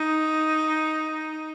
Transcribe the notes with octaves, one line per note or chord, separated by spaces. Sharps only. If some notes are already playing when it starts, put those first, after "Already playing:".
Already playing: D#4